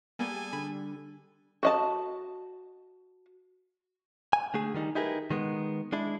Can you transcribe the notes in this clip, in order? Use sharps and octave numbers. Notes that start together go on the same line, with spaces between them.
G3 A#3 B3 G#4 A4 G#5
D3 B5
F#4 D#5 A5
G#5
D3 A3 G#4
D#3 G3 D#4
D#4 E4 G4 G#4 A#4 B4
D#3 G#3 B3
G#3 D4 E4